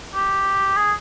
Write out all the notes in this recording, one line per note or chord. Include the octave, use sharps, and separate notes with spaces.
G4
G#4